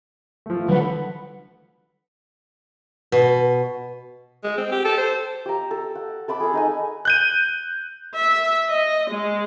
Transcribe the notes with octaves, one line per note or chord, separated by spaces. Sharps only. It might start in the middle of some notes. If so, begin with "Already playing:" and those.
F3 A3
D3 E3 F#3 G3 B4 F#5
B2
G#3
C4
G4
A4
C5
G4 A#5
A4
F#5
A4 A5 B5 D6
G#4 A4
D#4 D#5 G#5
F#6 G6 D#7
E5
D#5
G#3